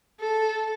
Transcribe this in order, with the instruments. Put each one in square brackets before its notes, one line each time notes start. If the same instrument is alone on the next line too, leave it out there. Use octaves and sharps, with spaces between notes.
[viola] A4